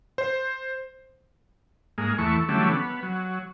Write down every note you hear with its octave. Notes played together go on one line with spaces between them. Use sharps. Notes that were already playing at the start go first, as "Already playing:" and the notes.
C5
G#2 G#3 A#3
E2 E3 A3 C#6
D3 E3 F#3 G3 A3 C#4
B3
F#3